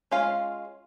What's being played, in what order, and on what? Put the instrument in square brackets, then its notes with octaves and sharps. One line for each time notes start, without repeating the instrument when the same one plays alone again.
[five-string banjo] G#3 C#4 F4 F5